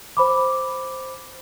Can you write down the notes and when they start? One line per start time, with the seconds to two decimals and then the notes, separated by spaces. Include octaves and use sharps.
0.17 C5 B5 D6